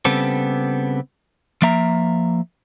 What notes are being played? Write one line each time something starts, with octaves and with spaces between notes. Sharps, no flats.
C#3 G3 B3 C4 A4
F3 A#3 E5 A#5